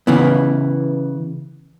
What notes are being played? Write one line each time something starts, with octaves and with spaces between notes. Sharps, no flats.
C#3 E3 B3